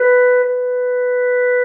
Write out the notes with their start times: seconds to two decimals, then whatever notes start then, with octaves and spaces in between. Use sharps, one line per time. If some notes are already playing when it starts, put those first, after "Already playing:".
Already playing: B4
0.44 B4